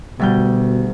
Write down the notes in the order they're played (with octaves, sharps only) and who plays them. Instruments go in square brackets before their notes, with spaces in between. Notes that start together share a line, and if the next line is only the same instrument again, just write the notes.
[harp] D2 G3 G6 [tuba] B2